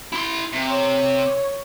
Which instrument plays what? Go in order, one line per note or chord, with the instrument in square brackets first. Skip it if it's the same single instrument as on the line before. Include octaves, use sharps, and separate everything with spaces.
[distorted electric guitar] E4 C6
C3
[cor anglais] C#5